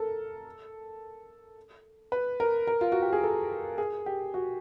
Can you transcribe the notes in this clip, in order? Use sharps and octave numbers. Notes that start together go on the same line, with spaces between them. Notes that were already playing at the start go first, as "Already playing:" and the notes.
Already playing: A4 A#4
B4
A#4
A#4
F4
F#4
G4
G#4
A4
G#4
G4
F#4